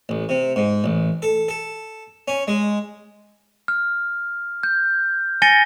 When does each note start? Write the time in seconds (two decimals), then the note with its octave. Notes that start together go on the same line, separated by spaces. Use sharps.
0.09 A1
0.29 C3
0.56 G#2
0.84 A1
1.22 A4
1.48 A4
2.28 C#4
2.48 G#3
3.68 F6
4.63 G6
5.42 G#5 A6 A#6 C#7 D#7 G7